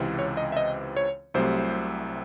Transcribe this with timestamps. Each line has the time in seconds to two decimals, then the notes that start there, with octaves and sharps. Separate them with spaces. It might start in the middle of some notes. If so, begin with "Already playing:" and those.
Already playing: C#2 C3 E3 C4
0.19 C#5
0.37 D#5
0.52 E5
0.57 D#5
0.97 C#5
1.34 C2 C3 F#3 A3 C4 C5